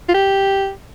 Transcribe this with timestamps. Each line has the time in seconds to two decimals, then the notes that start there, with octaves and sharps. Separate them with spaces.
0.09 F4
0.14 G4